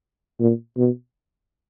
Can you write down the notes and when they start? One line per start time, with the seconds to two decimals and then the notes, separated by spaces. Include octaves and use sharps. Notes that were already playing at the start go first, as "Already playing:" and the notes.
0.40 A#2
0.78 B2